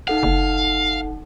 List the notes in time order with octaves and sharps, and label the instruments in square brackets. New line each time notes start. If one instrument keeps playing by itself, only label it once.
[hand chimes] D#4 A4 F#5 [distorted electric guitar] F5
[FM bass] F#1